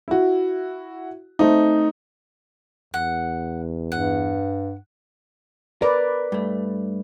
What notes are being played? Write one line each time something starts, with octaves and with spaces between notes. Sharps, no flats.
E4 F#4
A3 C4 D#4
E2 F#5
G2 F#5
A#4 B4 D5
G2 A3